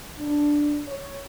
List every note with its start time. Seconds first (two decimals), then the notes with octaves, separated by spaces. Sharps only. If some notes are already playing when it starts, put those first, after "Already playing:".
0.19 D4
0.86 C#5